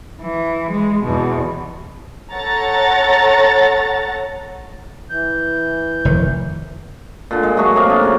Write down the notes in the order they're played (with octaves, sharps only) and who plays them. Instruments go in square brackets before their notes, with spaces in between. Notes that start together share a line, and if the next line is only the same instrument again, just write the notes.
[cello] E3
G#3
E2 B2
[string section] A4 C#5 F#5 A#5 A6
[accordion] E3 G6
[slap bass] F1 D#3
[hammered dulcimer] A#2 D3
G#3
F#3 A3 F#4 G#4
C3 A#3 G#4 A#4
D3
C#3 F#3